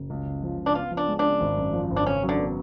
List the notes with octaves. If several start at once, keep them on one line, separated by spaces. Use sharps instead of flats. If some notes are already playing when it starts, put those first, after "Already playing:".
Already playing: F#1
C#2
C#3
F3
C#2
D4
B3 F4
F3
D4
G#3
D4
C#3
G#1
F#2
F3
G#1
D4
C#3 C#4
F#3
D3
B3